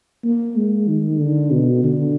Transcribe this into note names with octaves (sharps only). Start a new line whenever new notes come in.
A#3
G#3
D#3
D3
B2
D3